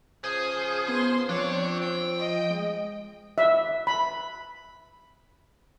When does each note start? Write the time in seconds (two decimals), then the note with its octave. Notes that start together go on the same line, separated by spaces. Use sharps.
0.24 C#3 F3 G#4 C5 D#6
0.88 B3 C6
1.29 F3 C4 D4 C#5 D5
1.82 G5
2.18 D#5
2.50 G#3
3.38 E5
3.87 B5